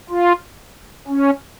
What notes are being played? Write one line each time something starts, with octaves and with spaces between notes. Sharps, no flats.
F4
C#4